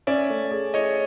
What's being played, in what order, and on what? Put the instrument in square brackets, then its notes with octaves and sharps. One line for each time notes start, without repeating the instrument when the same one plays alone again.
[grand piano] C#4 [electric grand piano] D5 E5
[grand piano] A3
G#4
[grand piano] E4 [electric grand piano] C#5 D#5